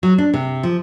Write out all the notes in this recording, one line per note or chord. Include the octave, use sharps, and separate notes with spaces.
F#3
D4
C3
F3